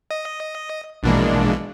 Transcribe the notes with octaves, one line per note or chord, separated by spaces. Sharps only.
D#5
A#1 B2 E3 G#3 A#3 D4